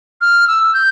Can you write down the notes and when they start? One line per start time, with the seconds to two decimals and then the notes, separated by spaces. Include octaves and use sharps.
0.21 F6
0.48 E6
0.73 G6